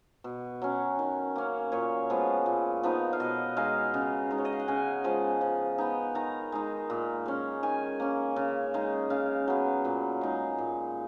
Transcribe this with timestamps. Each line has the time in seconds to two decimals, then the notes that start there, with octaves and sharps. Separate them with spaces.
0.24 B2
0.62 F#3 C#4
0.99 D#3
1.36 A#3 C#4
1.72 A#2 C#5
2.10 F3 G#3 B3
2.46 A#2
2.83 F3 B3 D#4
3.13 F5
3.20 B2 D#5
3.57 G#3 D#4 F5
3.94 C#3
4.31 G#3 D#4
4.38 C#5
4.45 D#5
4.53 F5
4.60 F#5
4.68 C#3 G#5
5.04 F3 G#3
5.41 F3
5.78 B3 D#4
6.15 D#3 A#5
6.52 G#3 D#4
6.90 A#2
7.26 G#3 C#4
7.63 D#3 G#5
8.00 A#3 C#4
8.36 C#3
8.74 G#3 D#4
9.10 C#3 F5
9.48 F#3 B3
9.85 A#2
10.21 G#3 D#4
10.58 A#2